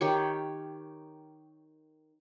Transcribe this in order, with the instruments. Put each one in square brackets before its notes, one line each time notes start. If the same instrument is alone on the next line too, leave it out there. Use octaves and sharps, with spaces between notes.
[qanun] D#3 G4 C#5